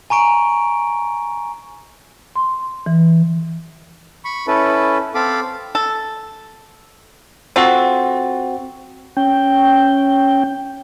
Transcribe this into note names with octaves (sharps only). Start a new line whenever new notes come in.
G#5 A#5 C#6 D7
C6
E3
B5 C#6
C#4 E4 A4 B4
C4 A4 F5 B5 D6
A4
C4 F4 F#4 A4
C#4 G5